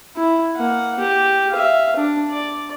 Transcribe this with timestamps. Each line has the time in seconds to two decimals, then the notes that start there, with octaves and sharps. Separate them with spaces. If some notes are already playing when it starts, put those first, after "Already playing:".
0.16 E4
0.56 A#3 F#5
0.99 G4
1.51 E5 F5
1.96 D4
2.30 D5